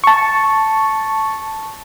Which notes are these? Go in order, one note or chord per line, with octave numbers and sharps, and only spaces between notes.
A5 C#6